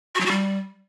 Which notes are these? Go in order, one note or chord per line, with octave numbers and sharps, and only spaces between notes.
F#4
F#3
F#4
G3